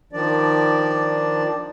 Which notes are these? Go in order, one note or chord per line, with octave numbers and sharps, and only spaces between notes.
D#3 F3 D4 D5